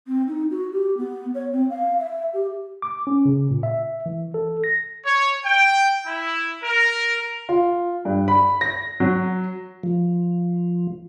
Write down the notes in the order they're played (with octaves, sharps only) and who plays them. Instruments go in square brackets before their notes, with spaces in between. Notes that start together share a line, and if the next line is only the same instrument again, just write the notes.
[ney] C4
D#4
F#4
G4
B3
C#5
C4
F5
E5
G4
[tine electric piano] D6
C#4
C#3
A#2
E5
E3
A4
A#6
[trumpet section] C#5
G5
E4
A#4
[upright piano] F4
G2
B5
A#6
F#3
[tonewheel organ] F3